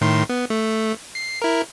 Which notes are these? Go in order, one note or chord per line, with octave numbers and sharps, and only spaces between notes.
A2 D#3 C6
B3
A3
C7
E4 A#4